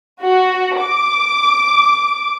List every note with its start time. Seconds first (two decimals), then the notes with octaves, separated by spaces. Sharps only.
0.22 F#4
0.81 D6